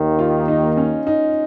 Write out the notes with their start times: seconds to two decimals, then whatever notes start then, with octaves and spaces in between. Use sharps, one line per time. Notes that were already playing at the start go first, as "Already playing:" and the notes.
Already playing: D#2 D#3 A#3
0.19 F4
0.48 D#4
0.77 C#4
1.07 D#4